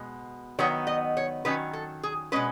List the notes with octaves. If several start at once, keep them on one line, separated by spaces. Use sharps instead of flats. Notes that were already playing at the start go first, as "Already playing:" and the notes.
Already playing: B2 G#3
D#3 F#3 B3 D#4 C#5
D#5
C#5
D#3 F#3 C#4 B4
A4
G#4
B2 G#3 C#4 B4